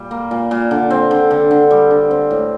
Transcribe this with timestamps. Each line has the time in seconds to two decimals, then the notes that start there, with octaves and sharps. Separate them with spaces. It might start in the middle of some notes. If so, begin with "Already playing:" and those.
Already playing: A#2 G3
0.11 A#3
0.31 A#2
0.51 A#2
0.71 D3
0.90 C4
1.11 D3
1.31 D3
1.51 D3
1.71 G3
1.91 D3
2.11 C4
2.31 A2